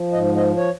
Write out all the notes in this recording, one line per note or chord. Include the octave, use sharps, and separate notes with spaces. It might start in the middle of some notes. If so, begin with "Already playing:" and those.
Already playing: F3
G#2 D#5
D#5
C#5